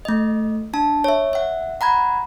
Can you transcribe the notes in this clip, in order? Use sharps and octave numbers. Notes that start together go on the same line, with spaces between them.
A3 D#5
D4 A5
C#5 E5
E5 F#5
F#5 A#5 B5 G#6